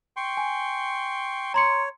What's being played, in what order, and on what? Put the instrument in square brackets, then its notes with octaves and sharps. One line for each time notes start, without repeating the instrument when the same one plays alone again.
[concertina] G5 C6 C#6
[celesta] G#5
[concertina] C#5 [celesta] A#5 C6 C#7